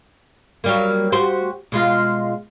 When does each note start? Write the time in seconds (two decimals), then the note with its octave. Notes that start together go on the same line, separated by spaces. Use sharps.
0.64 F#3 G3 A#3
1.12 F#4 G4 C5
1.72 B2 G#3 F4